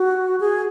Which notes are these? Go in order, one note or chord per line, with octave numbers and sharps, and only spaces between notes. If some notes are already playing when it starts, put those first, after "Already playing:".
Already playing: F#4
G#4